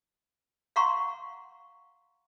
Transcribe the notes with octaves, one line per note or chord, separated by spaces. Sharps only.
F5 F#5 A#5 C6 C#6